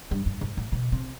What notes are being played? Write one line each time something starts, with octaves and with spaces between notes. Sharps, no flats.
G2
G2
G#2
A2
B2
C3